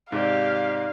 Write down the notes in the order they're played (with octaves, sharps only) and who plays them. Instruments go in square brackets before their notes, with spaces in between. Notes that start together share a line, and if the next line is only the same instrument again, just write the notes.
[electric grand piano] G#2 C3 [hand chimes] D#4 D5 [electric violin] G4 [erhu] F5